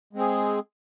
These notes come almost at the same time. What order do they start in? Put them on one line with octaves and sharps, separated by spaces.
G#3 C4 G#4